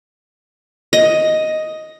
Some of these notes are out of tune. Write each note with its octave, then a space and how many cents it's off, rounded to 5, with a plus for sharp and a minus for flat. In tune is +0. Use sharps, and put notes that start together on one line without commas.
D#5 +5